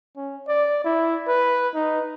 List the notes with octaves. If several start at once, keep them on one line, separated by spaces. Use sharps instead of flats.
C#4
D5
E4
B4
D#4